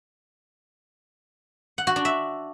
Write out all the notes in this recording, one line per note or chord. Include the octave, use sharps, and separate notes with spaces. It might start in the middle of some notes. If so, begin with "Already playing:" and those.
F#5
F#4
D4
E5